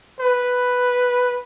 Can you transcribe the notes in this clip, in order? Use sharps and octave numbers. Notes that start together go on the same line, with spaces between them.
B4